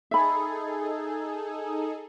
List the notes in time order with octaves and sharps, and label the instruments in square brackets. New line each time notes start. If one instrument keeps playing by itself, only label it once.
[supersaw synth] D#4 G#4 A4 [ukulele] E5 B5